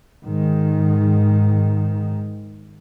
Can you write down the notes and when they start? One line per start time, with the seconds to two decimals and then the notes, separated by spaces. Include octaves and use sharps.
0.24 G#2 D#3